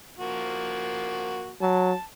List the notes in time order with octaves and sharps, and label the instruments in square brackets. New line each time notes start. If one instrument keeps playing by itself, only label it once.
[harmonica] F3 A#3 F#4
[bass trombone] F#3 [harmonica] A5